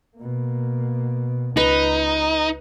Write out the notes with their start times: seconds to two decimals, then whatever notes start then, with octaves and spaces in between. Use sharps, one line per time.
0.17 B2 A#3
1.57 C#2 D#4 B4